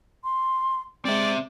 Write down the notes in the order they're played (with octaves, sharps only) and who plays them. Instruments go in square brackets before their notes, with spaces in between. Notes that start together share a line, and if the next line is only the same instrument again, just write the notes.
[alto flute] C6
[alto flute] G#3 [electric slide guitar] C4 E5 [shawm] D5